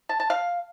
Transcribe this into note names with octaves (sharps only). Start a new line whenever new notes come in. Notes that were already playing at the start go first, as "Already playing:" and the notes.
A5
A5
F5